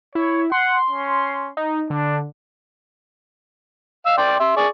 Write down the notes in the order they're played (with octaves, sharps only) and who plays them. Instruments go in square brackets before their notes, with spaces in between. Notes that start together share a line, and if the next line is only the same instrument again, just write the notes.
[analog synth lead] E4 [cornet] C#5
[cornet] F#5 [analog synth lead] C6
[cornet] C#4
[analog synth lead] D#4
[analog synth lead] D3 [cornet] D4
[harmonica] F5 E6
D5 G5 C6
E5 C6
G#4 D5 C#6